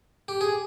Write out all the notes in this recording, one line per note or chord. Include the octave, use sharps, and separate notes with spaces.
G4
G#4